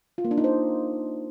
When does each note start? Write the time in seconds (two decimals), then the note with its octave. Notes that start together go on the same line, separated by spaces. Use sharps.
0.18 F4
0.25 A#3
0.31 D4
0.38 D#4
0.44 C5